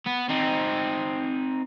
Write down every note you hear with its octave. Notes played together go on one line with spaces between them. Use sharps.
B3
C4 D#4